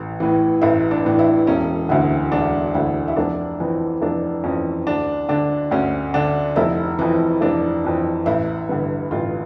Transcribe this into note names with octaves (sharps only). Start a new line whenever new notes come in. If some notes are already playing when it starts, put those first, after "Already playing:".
Already playing: A1
A2 E3
A1 E4
D4
A2 E3
E4
E1 C#4
D2 D3 E4
E1 D4
D2 D3 E4
E4
F1 D4
F2 E3
F1 D4
F2 E3 C#4
D2 D4
D3 D4
D2 C#4
D3 D4
F1 E4
F2 E3
F1 D4
F2 E3
A1 E4
G2 D3
A1 F4